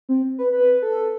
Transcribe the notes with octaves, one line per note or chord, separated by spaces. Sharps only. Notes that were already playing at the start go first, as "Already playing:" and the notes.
C4
B4
B4
A4